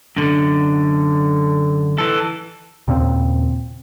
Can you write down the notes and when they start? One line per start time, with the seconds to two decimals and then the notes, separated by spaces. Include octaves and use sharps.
0.16 F#2 D3
1.98 E3 A4
2.88 D#2 A#2 C#3 C4